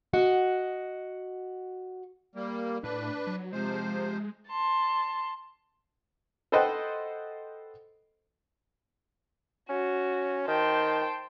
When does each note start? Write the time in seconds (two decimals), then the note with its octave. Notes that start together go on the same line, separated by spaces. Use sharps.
0.13 F#4 D#5 F#5
2.35 G3 A#3
2.83 A2 D4 B4
3.27 F#3
3.52 C3 F3 G#3 C5
4.48 A5 C6
6.52 A4 B4 C5 D#5 F#5 G5
9.69 C#4 F#4
10.47 D#3 C5 G5 A5